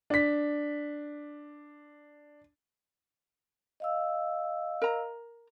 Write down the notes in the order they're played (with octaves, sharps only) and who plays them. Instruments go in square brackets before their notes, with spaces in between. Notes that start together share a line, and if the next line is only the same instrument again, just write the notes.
[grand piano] D4 B6
[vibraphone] D#5 F5 E6
[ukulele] A#4 A#5